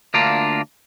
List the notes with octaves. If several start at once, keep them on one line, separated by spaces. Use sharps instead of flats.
D2 A#3 D4 F4